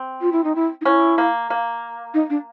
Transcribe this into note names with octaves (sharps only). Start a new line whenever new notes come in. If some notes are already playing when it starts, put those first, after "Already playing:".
Already playing: C4
F4
E4
D#4
E4
D#4
C#4 E4
A#3
A#3
D#4
D4